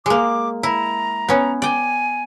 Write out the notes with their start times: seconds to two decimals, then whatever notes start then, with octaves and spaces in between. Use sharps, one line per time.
0.06 G#3 A#3 D6
0.63 E4 A#5
1.29 B3 C#4
1.62 D5 G5 G#5